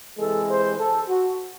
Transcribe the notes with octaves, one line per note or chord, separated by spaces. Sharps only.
C3 E3 G#3 A4
C5
A4
F#4